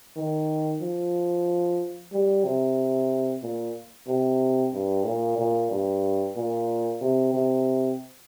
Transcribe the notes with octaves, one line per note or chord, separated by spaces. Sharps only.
D#3
F3
G3
C3
A#2
C3
G2
A#2
A#2
G2
A#2
C3
C3